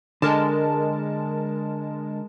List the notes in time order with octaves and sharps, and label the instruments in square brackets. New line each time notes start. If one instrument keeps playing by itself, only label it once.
[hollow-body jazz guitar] D3 [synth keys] G#3 A#4 A5